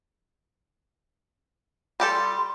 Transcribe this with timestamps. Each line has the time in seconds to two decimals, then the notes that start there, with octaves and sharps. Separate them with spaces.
2.00 G3 G4 A4 C6